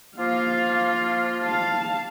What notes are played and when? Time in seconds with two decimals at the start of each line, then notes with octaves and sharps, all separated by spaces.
0.18 F3 A#3 F4 F5
1.43 F5 A5